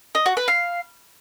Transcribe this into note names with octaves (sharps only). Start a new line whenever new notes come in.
D#5
F#4
B4
F5